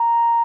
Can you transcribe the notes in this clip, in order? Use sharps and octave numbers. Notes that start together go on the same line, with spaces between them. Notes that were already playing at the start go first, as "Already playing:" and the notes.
Already playing: A#5